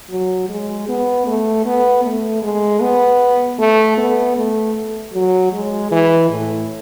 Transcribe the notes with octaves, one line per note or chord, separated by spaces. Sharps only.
F#3
G#3
B3
A3
B3
A3
G#3
B3
A3
B3
A3
F#3
G#3
E3
A2